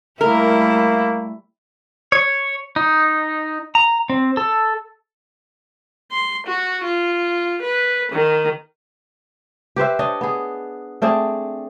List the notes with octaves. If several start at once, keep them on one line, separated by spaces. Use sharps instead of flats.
G3 A3 A#3 E4 A#4
C#5
D#4
A#5
C4
A4
C6
F#4
F4
B4
D#3
G4 B4 C5 E5
D4 C#5 D#5
B3 G#4
A3 C4 D4 G#4